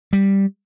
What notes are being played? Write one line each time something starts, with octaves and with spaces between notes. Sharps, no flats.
G3